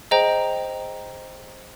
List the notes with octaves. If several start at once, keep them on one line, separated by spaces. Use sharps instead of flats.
G#4 C5 D#5 G5 A#5